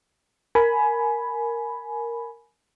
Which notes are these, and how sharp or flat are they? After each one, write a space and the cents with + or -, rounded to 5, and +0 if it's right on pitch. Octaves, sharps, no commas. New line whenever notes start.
A#4 +0 G#5 +20 B5 +0